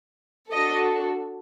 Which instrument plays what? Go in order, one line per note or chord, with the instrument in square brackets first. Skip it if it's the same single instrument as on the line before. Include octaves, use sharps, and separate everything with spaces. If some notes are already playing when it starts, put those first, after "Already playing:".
[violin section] D4 F#4 A4 D#5